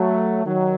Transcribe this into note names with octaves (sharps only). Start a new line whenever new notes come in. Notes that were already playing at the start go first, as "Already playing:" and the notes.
Already playing: F#3 A3
D#3 F#3